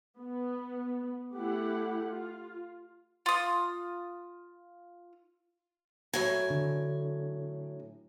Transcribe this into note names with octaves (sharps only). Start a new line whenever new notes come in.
B3
A3 E4 G4 F#5
F4
F4 D#6
A2 F#3 G#5
D3